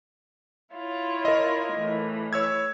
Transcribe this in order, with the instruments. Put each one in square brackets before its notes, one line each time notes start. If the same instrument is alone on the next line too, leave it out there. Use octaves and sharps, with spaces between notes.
[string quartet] E4 F4 C#5
[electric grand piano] A#4 D#5
[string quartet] A2 E3
[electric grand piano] C#5 E6 G#6